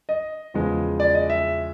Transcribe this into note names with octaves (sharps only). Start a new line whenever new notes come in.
D#5
E2 C#3 F3 G#3
D5
D#5
E5